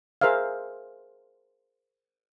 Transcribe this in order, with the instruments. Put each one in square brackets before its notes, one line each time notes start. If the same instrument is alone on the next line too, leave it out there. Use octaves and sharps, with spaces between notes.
[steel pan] G#4 A#4 C5 E5 F5